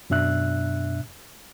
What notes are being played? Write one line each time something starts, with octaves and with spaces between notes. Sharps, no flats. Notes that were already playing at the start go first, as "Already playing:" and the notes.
F#2 B2 D4 E5 F#6